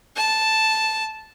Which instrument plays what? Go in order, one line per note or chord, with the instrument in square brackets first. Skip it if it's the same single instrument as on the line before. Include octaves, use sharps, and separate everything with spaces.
[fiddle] A5